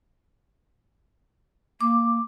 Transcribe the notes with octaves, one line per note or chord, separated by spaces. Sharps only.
A#3 D6